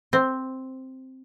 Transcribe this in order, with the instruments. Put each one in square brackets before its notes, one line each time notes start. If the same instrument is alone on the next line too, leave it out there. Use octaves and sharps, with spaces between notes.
[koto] C4